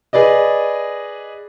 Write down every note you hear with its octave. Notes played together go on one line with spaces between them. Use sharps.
G#4 B4 D5 D#5